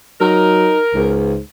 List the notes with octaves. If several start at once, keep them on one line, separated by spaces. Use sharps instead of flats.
F#3 D#4 A#4
C#2 G#2